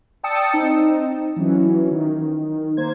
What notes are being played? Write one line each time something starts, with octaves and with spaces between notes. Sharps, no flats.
D5 G5 A5 D#6 E6 C#7
C4 D#4
E3 F#3 C#4
D#3
A#3 C5 G#6